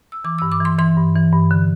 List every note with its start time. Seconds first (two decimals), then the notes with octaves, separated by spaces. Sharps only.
0.12 E6
0.24 E3 D6
0.38 G2 E6
0.52 D6
0.60 E3
0.65 C6
0.78 E3 C6
0.97 G2
1.15 E3
1.33 G2
1.51 D3